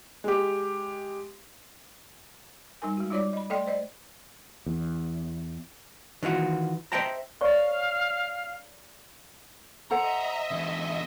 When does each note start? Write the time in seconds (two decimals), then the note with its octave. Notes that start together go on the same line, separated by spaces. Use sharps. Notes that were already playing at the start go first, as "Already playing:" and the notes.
0.24 G#3 G4
2.82 G3 D#4 A#4 G#5
2.97 G#3 F#4
3.10 G3 D#4 F4 C#5 D5 D6
3.33 D#5 B5
3.50 A3 A4 D5 D#5 G5 C6
3.67 C5 D5 D#5
4.66 E2
6.22 D#3 E3 F4 F#4
6.92 C5 D#5 E5 G5 A5 A#5
7.41 C#5 D5 F5 C#6
9.91 A4 C5 D#5 E5 F#5 A#5
10.51 E2 D3